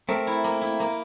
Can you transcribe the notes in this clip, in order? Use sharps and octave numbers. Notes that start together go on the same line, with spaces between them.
A3 C4 A#4
E4
A#3
E4
A#3